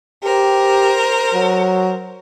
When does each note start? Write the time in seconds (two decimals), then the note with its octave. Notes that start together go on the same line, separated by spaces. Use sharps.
0.23 G4 A#4 C5
1.34 F#3